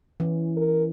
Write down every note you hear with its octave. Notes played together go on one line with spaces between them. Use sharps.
E3 C#4
A#4